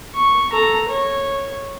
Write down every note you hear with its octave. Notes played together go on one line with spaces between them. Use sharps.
C#6
A4 A#5
C#5